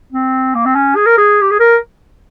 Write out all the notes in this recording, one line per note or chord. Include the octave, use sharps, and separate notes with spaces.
C4
A#3
C4
C#4
G#4
A#4
G#4
G4
G#4
A#4